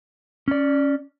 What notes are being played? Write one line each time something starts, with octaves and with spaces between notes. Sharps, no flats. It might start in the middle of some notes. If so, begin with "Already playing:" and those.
C#4 D5